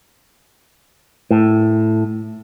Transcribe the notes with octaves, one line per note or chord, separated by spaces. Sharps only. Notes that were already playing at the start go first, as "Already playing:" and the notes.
A2